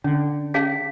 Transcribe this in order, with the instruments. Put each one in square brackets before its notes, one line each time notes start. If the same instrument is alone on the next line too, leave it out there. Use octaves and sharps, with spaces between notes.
[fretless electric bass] D3 [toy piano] C#4
[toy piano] C#4 G#4 F5 [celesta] B6